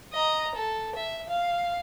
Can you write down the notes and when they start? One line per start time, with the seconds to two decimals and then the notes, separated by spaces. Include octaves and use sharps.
0.13 D#5 A#5
0.55 A4
0.95 E5
1.29 F5